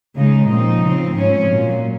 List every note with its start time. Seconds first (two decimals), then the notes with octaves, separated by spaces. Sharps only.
0.16 C#3 G#3 D#4
0.49 A#2 F3 C4 D#4
0.81 C#3 F3 C4
1.14 G#2 F3 G#3 C#4
1.45 A#2 F#3 A#3